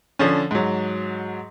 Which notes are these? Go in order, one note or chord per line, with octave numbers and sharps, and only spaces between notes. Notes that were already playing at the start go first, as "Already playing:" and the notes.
D3 F3 C#4
G#2 F#3